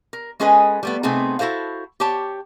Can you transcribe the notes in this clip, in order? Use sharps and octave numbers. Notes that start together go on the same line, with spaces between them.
A#4
G#3 C#4 G#4 A4 B4 D#5
G3 A3 B3
C3 A3 B3 C4 D#4 G#4
E4 F#4 A4 C5 F5
G4 C5 C#5 A5